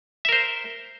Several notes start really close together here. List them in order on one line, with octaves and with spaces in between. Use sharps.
E5 A#4 C5